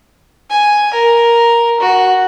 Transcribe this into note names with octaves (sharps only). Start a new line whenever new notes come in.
G#5
A#4
F#4